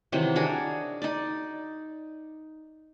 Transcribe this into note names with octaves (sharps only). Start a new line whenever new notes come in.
C3 D#3 E3 F#3
D4 F#4 G#4 A#4
D#4 D5